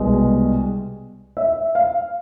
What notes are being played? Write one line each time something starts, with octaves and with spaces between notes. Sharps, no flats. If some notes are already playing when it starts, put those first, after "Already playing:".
Already playing: C2 B2 G#3
E5
F5